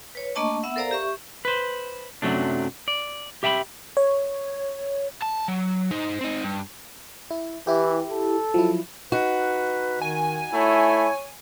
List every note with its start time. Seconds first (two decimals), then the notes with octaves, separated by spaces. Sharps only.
0.15 B4 C#5
0.35 A3 A#3 D4 D#5 A5 C#6
0.63 B3 E5 F#5 E6
0.76 A4 A#4 C5 D5 F5 A#5
0.91 G4 E5 C#6
1.45 B4 C5
2.22 F#2 C3 D#3 F#3 A3 D4
2.88 D5
3.43 G4 E5 G5 A5 B5
3.97 C#5
5.22 A5
5.48 F#3
5.91 D#4 C5
6.21 C4 D#4
6.43 G2
7.31 E4
7.67 E3 E4 G4
8.10 A4
8.54 F3 F#3 E4
9.12 D#4 F#4 B4
10.01 D#3 G#5
10.52 A3 E4 C#5